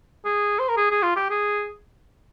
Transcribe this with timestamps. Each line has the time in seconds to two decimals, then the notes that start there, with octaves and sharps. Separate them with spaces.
0.25 G#4
0.59 C5
0.68 A#4
0.77 G#4
0.91 G#4
1.03 F4
1.16 G4
1.30 G#4